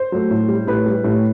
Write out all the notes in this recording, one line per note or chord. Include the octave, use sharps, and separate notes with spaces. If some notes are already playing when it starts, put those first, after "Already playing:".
Already playing: C5
F#3 A3
A2
G3
A2 B4
G3
A2